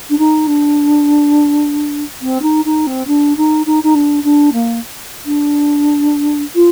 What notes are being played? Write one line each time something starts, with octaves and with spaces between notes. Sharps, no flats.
D4
D#4
D4
C4
D#4
D#4
C4
D4
D#4
D#4
D#4
D4
D4
A#3
D4
F4